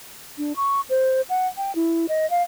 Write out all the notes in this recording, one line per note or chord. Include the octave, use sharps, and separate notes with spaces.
D4
C#6
C5
F#5
G5
E4
D#5
F5